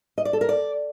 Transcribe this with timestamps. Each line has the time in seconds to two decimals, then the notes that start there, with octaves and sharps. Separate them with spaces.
0.18 D#5
0.25 D5
0.33 A4
0.41 A#4
0.49 D5